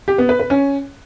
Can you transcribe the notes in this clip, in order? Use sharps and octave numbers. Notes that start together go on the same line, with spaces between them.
G4
B3
B4
B4
C#4